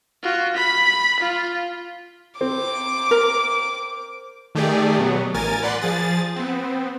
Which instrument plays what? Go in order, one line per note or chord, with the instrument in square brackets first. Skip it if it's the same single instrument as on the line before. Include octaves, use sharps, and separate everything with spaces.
[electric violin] F4 F#4
B5 B6
F4
[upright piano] C4 [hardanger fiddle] D6
[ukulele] A#4
[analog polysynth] D#3 A3 G4 G#4 D5
B2 F#3 B3
A1 A#4 G#5 A6
B4 D5 F#5 C6
F3 G#4 A6
B3 C4